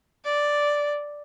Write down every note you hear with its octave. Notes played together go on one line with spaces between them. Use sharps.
D5